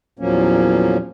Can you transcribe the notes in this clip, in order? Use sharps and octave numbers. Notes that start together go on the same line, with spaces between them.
E2 A#2 F3 F#3 A#3 C#4